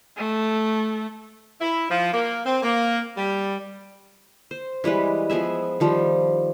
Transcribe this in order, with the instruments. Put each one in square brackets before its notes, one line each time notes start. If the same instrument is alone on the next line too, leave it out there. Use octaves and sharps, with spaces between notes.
[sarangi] A3
[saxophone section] E4
F3
A#3
C4
A#3
G3
[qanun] C5
E3 G3 G#3 B4
F3 B3 G#4 E5
D#3 F3 G3